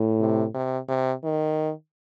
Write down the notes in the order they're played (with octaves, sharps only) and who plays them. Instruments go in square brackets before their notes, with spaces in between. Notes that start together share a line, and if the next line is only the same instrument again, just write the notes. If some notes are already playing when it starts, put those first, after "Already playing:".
Already playing: [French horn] A2
[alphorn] C3
C3
C3
D#3